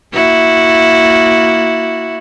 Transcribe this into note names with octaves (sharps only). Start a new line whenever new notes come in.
A#3 E4 F#4